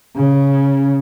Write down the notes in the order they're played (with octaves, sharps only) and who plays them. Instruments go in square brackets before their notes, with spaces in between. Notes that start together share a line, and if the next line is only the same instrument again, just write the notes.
[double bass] C#3